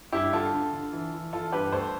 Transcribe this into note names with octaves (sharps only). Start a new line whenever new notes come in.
G2 E4 G4
D3 F4 A4
D3
D3
E3
E3
E3 F4 A4
G2 G4 B4
D2 A4 C5